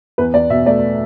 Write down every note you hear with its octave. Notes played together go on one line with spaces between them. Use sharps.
E2 B4
E2 D5
B2 E5
A3 D5